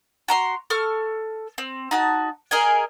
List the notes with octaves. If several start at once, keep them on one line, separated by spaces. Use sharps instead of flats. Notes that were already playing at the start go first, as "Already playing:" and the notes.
F#4 A#5 C6
A4 C#6 F6
C4
D#4 F#4 A5
G#4 A#4 D#5 G#5